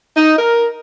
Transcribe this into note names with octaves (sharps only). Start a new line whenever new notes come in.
D#4
A#4